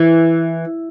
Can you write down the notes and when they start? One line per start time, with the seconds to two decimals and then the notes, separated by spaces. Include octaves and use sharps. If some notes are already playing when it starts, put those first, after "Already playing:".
Already playing: E3